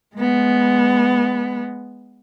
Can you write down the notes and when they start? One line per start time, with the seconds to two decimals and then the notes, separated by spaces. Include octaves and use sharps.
0.15 G#3 B3